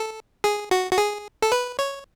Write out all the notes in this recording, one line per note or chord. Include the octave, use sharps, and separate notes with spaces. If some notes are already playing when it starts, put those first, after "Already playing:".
Already playing: A4
G#4
F#4
F#4
G#4
A4
B4
C#5